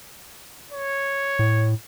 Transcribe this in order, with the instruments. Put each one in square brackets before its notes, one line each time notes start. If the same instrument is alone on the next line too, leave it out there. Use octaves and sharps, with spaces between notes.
[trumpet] C#5
[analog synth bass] A2